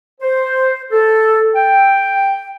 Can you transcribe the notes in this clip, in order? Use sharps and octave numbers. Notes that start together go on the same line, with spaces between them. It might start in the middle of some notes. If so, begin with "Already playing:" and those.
C5
A4
G5